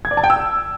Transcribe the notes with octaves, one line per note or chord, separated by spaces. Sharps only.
G#6
D5
A5
G5
E6